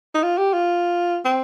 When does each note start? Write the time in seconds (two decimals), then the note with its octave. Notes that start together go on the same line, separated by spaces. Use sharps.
0.14 D#4
0.23 F4
0.38 G4
0.53 F4
1.25 C4